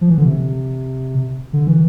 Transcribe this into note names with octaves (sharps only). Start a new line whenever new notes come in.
F3
E3
D3
C3
D3
E3